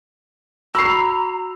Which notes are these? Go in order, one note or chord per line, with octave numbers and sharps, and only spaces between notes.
F#4 A#5 B5 E6 C7